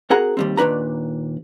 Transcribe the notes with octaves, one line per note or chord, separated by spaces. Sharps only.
C4 F#4 G#4 A#4 F#5 A#5
D#2 G3 C4
D#2 A#2 D4 B4 A#5